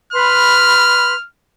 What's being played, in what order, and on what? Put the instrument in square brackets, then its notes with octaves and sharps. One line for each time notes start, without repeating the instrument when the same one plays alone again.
[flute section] B4 B5 C6 [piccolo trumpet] F6